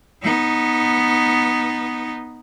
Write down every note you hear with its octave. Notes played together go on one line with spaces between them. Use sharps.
B3 D#4